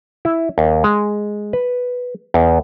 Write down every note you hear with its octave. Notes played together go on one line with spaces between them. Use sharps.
E4
D#2
G#3
B4
E2